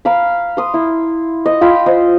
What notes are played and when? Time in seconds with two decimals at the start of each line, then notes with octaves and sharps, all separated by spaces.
0.05 F5 A#5 B5
0.57 C6 D#6
0.74 E4
1.46 D#5
1.61 F4 G5 B5
1.86 C5 D#5